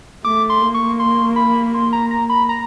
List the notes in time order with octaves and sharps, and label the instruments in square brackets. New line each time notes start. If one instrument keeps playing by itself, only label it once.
[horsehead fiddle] A3 [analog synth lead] D6
[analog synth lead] C6
[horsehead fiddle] A#3
[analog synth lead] C#6
C6
B5
C6
A#5
A#5
B5
A#5